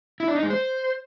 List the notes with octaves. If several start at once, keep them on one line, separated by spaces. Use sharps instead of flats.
E4
D4
D#4
G#3
C5